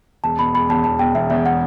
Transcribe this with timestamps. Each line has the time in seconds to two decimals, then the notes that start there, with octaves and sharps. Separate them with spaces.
0.24 E1 A5
0.39 B2 B5
0.54 E1 B5
0.69 E2 A5
0.84 E1 A5
0.99 B2 G5
1.15 E1 E5
1.30 E2 E5
1.46 F#5